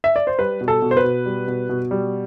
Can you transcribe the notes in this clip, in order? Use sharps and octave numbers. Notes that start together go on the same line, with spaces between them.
E5
D5
C5
G3 B4
B2
A4
B2
C5
B4
B2
G3
B2
B2
G3